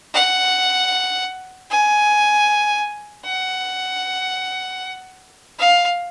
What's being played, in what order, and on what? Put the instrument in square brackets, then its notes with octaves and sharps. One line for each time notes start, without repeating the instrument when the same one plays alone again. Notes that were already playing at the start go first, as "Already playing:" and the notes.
[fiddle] F#5
G#5
F#5
F5